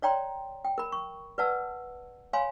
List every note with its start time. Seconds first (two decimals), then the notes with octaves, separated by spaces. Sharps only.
0.02 C#5 D5 G5 A#5 C6
0.65 G5
0.78 A#4 B5
0.92 C#6
1.38 B4 D5 F#5 A5 E6
2.33 C#5 F5 G#5 B5 C6